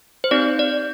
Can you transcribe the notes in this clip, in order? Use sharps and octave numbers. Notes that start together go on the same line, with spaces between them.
C5
C4 D#4 G4 D5
D5